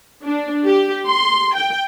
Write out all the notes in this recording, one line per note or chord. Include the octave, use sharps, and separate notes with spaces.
D4
G4
C6
G5